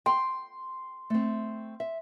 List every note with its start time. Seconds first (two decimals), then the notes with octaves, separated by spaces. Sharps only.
0.06 G5 C6
1.10 A3 C4
1.80 E5